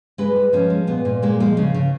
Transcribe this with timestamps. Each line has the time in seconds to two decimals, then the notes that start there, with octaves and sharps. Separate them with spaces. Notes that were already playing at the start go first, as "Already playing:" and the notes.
0.18 G#3 B4
0.36 G#3
0.53 F3 C#4
0.70 G#3
0.87 A#2 B3
1.05 A#2
1.22 G#3 A#3
1.40 F3 G#3
1.57 C#3
1.74 C#3